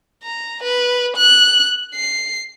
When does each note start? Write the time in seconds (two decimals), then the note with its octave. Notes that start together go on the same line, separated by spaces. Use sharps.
0.23 A#5
0.63 B4
1.17 F#6
1.95 C7